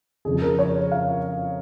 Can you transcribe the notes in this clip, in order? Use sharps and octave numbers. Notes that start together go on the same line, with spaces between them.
F2 C#3 F3 G#4
G#4
A#4
C#5
F5